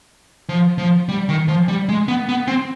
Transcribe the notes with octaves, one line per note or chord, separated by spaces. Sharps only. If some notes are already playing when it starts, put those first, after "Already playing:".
F3
F3
G3
D#3
F3
G3
G#3
B3
B3
C4